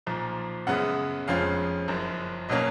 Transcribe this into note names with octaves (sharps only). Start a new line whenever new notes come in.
B1 A#2 F3
F#2 C#3 G#3 B3 F#5
F1 F2 F3 G#3 C#4 F5
F#1 F#2 F3
B2 F#3 A#3 C#4 D#5